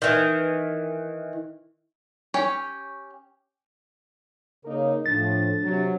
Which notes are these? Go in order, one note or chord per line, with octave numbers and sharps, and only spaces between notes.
D#3 E3
C#4 G4 C#5
C#3 A#3 D#4 A#4
A2 F3 D4 A6
C3 F#3